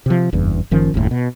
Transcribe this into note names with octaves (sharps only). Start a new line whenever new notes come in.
C3 F3
F#1 E2 G2
F#1 D#3 F3 C#4
F#1 D#2 A2
B2